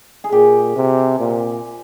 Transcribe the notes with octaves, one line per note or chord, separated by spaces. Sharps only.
G#4
A#2 G4
C3
A#2